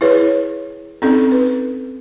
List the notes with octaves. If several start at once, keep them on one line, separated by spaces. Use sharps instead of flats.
E4 G#4 B4 C#5
C4 C#4 D#4 A4
B4